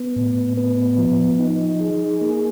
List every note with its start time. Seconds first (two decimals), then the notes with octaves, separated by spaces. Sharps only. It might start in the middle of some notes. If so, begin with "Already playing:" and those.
Already playing: B3
0.16 A2
0.57 B3
0.98 F3
1.39 D#4
1.80 G#4
2.21 A#3